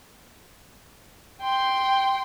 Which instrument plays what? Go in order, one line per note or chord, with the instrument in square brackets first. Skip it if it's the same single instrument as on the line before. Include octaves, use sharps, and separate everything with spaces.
[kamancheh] G5 C6